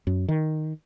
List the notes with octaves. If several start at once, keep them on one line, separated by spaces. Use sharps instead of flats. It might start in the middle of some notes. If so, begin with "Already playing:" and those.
F#2
D#3